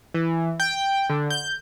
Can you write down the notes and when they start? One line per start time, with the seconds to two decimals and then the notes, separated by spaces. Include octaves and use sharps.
0.14 E3
0.60 G5
1.09 D3
1.30 G6